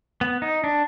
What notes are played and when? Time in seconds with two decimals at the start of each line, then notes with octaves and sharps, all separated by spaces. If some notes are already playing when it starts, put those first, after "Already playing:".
0.21 B3
0.42 D#4
0.64 D4